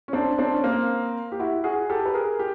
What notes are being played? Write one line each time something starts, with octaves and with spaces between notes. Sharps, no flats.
C#4
C4 D4
C4 D4
C#4
A#3 C4
G4
E4 F#4
F#4 G#4
G4 A4
B4
G#4 A#4
G4